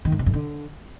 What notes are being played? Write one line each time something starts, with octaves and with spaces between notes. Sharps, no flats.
D#3
G#2
C3
G2
D3